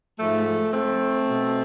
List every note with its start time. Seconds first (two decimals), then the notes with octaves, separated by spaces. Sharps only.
0.19 G#2 F3 A3
0.73 A3 C4
1.28 B2